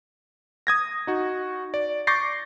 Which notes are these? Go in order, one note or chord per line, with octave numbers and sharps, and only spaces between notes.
D#6 G#6 A#6
D#4 F#4
D5
C#6 D6 G6 A6 A#6 C7